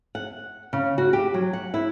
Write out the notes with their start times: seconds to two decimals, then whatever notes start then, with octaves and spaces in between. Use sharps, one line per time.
0.15 F#5
0.73 C#3
0.98 F#4
1.13 G4
1.34 F#3
1.53 F#5
1.74 E4